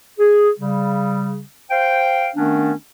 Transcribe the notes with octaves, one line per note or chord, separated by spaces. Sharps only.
G#4
C#3 G3
C5 F5 G5
D#3 A3 B3 C#4 D4